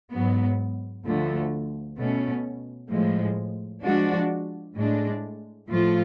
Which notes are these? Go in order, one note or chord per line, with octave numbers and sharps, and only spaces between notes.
G#2 F#3 B3
D2 D3 F3 A3
B2 A3 C#4
A2 F3 G#3
F3 G#3 D4 F#4
A2 G#3 D4
A2 F3 A3 F4